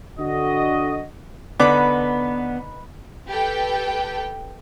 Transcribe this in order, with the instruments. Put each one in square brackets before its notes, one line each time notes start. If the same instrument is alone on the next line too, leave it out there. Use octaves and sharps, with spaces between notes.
[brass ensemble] D3 F#4 D#5
[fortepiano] D3 D6 [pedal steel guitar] B3 [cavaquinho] D#4 B4 B5 [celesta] D5
[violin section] G4 A4 B4 G5